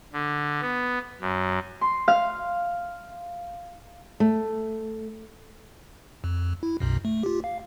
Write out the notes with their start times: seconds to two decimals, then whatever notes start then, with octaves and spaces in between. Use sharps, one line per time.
0.13 D3
0.62 B3
1.21 F#2
1.81 C6
2.08 F5
4.20 A3
6.24 F2
6.63 E4
6.80 B1 F#2 B2
7.05 A3
7.23 F4 G4
7.44 F5